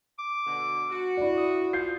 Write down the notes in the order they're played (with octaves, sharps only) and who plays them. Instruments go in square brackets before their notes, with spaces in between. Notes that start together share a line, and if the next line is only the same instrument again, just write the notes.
[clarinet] D6
[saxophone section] B2 D3
F#4
[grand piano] E4 D5
[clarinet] D#6
[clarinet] F4 [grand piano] G6 C7